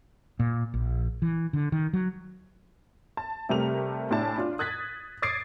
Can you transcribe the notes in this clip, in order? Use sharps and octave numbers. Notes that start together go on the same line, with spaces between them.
A#2
A#1
E3
D3
D#3
F#3
A5
C3 G3 A3 A#4 F7
A2 D4 E4 G#5 A5
D4 F4
D#6 F#6 G#6 A6 B6
D6 D#6 G#6 A6 C7 D7